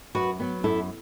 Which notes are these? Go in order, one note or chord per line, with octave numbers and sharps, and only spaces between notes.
F#2 F#4 B4
F#3 B3
F#2 E4 A4